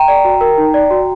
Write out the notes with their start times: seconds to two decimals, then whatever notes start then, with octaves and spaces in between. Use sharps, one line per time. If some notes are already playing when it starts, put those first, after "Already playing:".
Already playing: G5 A#5
0.08 D5
0.25 F#4
0.41 A#4
0.58 D#4
0.74 D5
0.91 F#4